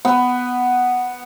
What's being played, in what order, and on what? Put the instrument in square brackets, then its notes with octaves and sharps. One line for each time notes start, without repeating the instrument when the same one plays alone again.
[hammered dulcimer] B3